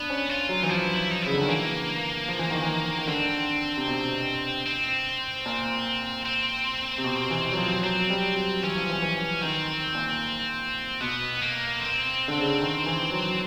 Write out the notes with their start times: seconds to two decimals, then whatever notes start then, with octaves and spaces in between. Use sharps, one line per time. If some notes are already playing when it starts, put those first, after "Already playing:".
Already playing: B3 D4
0.10 C#4
0.29 F4
0.49 F#3
0.63 E3 D#4
0.69 F3 E4
0.96 E4
1.11 D#4
1.22 C#3 E4
1.34 D3
1.41 D#3
1.48 E3 A#3
2.28 F3
2.39 E3
2.51 D#3
2.62 E3
2.98 D#3
3.07 D3 C4
3.77 C3
3.87 B2
4.66 C4
5.46 A#2
6.25 C4
6.98 C3
7.04 B2
7.31 E3
7.52 F#3
7.57 F3
7.83 F#3 C4
8.10 G3
8.36 F#3
8.63 E3 C#4
8.76 F3
8.89 E3
9.02 E3
9.42 D#3 C4
9.95 A#2
11.00 B2 B3
11.41 A#3
11.80 C4
12.28 D3
12.39 C#3
12.60 D#3
12.86 E3
13.12 F#3